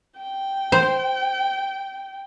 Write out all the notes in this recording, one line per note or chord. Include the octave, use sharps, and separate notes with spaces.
G5
C5